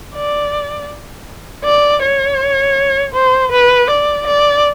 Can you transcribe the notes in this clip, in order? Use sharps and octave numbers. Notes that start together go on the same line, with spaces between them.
D5
D5
C#5
C5
B4
D5
D5